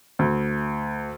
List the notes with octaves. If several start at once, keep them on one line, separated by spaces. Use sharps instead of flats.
D2